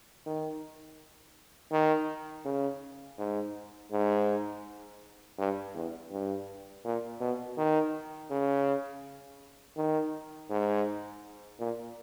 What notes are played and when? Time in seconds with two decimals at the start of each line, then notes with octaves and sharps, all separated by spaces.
0.26 D#3
1.72 D#3
2.46 C#3
3.18 G#2
3.92 G#2
5.38 G2
5.75 E2
6.12 G2
6.85 A#2
7.21 B2
7.58 D#3
8.31 C#3
9.77 D#3
10.50 G#2
11.60 A#2